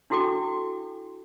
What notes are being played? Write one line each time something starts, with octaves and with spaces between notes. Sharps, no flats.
D4 E4 F#4 A4 G5 D6